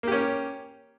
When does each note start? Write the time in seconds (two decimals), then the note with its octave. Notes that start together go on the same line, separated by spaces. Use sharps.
0.03 A#3
0.07 G4
0.12 C#4